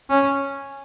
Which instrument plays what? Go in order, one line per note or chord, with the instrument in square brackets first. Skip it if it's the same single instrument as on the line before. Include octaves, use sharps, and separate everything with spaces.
[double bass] C#4